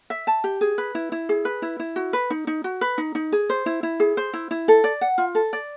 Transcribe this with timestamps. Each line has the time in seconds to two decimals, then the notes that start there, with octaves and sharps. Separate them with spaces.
0.10 E5
0.27 A5
0.44 G4
0.61 G#4
0.78 B4
0.95 E4
1.12 E4
1.29 G#4
1.45 B4
1.62 E4
1.80 E4
1.96 F#4
2.13 B4
2.30 D#4
2.47 D#4
2.64 F#4
2.81 B4
2.98 D#4
3.15 D#4
3.32 G#4
3.50 C5
3.66 E4
3.83 E4
4.00 G#4
4.17 C5
4.33 E4
4.51 E4
4.68 A4
4.84 D5
5.01 F#5
5.18 F4
5.35 A4
5.53 D5